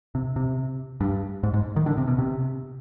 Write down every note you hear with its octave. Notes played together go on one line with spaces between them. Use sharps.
C3
C3
G2
G#2
G#2
D#3
D3
C3
B2
C3